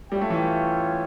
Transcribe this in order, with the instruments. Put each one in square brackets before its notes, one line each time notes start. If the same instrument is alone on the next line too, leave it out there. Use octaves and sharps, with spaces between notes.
[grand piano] G3 [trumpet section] C#4 F4 C#5 E5 G5
[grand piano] A3
E3